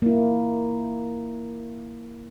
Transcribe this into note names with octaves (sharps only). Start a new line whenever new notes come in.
A#3 E4